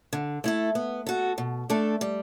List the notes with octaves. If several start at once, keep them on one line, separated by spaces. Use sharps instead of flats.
D3
A3 E4 A4
B3
F#4 A4
B2
A3 D4 A4
G3